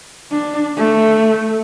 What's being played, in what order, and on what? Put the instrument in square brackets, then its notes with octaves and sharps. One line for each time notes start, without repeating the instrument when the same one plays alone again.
[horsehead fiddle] D4
A3